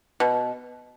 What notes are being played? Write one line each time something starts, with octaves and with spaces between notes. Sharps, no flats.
B2